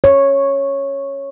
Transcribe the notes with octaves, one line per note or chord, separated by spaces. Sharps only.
C#5